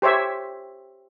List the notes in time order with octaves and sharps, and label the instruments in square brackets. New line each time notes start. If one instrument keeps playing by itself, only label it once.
[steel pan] G4 C5 C#5 E5